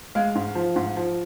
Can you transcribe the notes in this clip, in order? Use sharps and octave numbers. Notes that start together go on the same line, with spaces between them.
G#3 F5
G#2
F3
G#2
F3